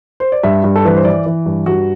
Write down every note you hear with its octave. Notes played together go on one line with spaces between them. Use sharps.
C5
D5
G2 E5
G2
A4
E3 B4
C5
E3 D5
E3
G2
G2 F#4